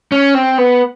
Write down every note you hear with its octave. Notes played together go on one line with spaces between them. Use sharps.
C#4
C4
B3